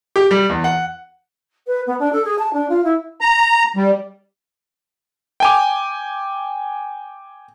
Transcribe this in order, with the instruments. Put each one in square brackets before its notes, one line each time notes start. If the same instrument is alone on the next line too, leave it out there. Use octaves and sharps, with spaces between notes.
[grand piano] G4
G3
E2
F#5
[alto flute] B4
B3
D4
A4
G#4
A5
D4
F4
E4
[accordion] A#5
G3
[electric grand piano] G5 G#5 D6